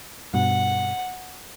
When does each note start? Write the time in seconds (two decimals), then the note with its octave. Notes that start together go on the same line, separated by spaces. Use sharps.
0.34 G2 B2 F#5